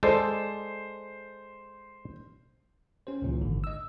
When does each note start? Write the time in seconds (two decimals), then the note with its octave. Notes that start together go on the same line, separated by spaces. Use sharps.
0.03 G#3 A4 C5 D5
3.07 C#4 G4 C5
3.22 C#2 A#2 E3
3.42 G#1 G#2 D3
3.64 D#5 E6